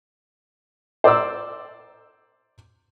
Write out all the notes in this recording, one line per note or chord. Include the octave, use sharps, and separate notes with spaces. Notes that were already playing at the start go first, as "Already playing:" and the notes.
C5 D5 A#5 D6 E6